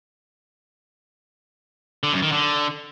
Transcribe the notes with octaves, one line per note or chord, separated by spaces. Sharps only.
D3
F#2
D#3
D3